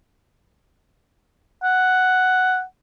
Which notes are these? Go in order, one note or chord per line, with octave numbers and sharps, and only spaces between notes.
F#5